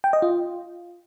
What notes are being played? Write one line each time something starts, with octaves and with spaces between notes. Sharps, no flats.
G5
D#5
F4